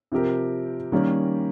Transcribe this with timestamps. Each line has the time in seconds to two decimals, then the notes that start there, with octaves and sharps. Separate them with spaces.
0.12 C3 F3 C4 G4 A#4
0.92 D#3 G3 A#3 C#4